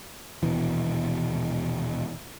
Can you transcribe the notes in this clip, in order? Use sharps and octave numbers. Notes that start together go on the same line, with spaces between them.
D#1 A#1 B2 E3